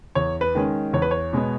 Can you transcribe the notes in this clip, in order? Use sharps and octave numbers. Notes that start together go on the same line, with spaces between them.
E2 C#5
B4
D#3 G#3 C#4
E2 C#5
B4
C#5
B2 G#3 B3